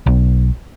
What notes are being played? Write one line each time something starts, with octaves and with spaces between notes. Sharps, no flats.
B1